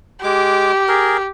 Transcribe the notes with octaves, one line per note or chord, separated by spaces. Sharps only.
G#3 G4 D6
G#4 A#4